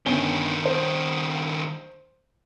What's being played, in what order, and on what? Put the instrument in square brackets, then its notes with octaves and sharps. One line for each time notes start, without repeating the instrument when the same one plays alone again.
[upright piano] G1 C#4 G7 [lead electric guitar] G2 D#3
[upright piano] C5